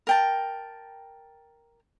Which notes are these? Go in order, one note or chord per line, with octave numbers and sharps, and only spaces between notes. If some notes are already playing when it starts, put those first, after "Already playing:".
A#4 G5 A5